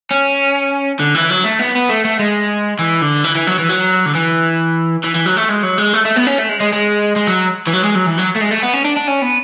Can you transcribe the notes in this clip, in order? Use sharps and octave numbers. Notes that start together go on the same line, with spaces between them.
C#4
D3
E3
F#3
A3
B3
B3
A3
A3
G#3
E3
D3
E3
E3
F#3
E3
F#3
D3
E3
E3
E3
F#3
A3
G#3
F#3
G#3
A3
A3
B3
C#4
A3
G#3
G#3
G#3
G#3
F#3
E3
F#3
G#3
F#3
E3
F#3
A3
G#3
A3
B3
C#4
D4
D4
C#4
B3